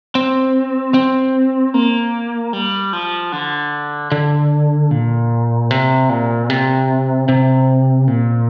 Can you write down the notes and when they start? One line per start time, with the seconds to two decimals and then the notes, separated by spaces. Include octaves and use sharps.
0.15 C4
0.94 C4
1.74 A#3
2.53 G3
2.93 F3
3.32 D3
4.12 D3
4.91 A#2
5.71 C3
6.09 A#2
6.50 C3
7.29 C3
8.08 A#2